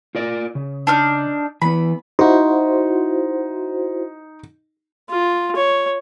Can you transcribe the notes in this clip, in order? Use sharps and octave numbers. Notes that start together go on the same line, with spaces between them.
F4 A#4 D5
C#3
D4 D#4 F6
E3 B3 B5
D#4 E4 F#4 C5
F4
C#5